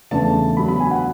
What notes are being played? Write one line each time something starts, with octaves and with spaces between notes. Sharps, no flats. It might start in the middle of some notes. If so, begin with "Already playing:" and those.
E2 C#3 E3 A3 D4 A5
D3 F#3 B3 B5
B5
G#5
F#5